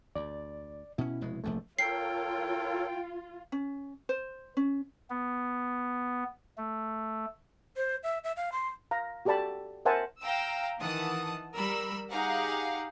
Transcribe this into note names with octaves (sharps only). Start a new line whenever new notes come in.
D2 D5
B2 C#4 E4
F1 B2 G#3
F1 A#1 E2 A3
F4 A4 A#4 C#5 G5 C7
C#4
C5
C#4
B3
A3
C5
E5
E5
F5
C6
F5 A#5
F#4 G4 A4 D5 A5 B5
A#4 C5 E5 F#5 G#5 A5
F5 G5 A#5 E6
D#3 E3 F#5 A5 D#6
G3 A#4 B5 E6
D#4 G4 G#4 F5 F#5 A#5